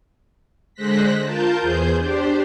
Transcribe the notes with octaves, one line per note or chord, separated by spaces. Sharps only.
D3 G#3 C5 F#6 A#6 B6
F4 A#4 A5 G6
E2 G#4 C5 G6
D4 G4 C5